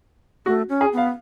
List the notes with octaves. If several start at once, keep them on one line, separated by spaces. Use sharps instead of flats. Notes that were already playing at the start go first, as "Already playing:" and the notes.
A3 F#4
C#4
G#4
B3 F5